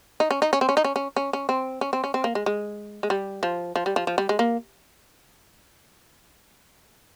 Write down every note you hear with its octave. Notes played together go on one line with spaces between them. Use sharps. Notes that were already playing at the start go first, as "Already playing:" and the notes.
D#4
C#4
D#4
C#4
C4
C#4
D#4
C#4
C#4
C#4
C#4
C4
C#4
C4
C#4
C4
A#3
G#3
G#3
G#3
G3
F3
F3
G3
F3
F3
G3
G#3
A#3